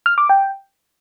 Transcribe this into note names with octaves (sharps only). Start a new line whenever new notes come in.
F6
D6
G5